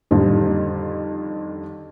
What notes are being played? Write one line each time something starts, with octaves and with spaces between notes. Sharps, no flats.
F2 D3 D#3 G3